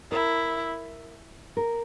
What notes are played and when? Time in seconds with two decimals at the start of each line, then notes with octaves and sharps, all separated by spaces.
0.11 E4 A#4
1.57 A#4